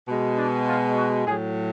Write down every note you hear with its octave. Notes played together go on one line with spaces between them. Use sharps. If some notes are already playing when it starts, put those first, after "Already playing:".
B2 G#3
D4
F4
F#4
A2 F#3 G#4